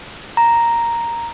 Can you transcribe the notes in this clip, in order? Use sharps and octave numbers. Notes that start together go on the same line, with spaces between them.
A#5